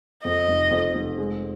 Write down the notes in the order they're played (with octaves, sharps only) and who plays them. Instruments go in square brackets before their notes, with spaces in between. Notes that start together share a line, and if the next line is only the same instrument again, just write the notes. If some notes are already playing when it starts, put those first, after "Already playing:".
[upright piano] F2 [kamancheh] D#5
[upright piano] F1
F2
F1
G#3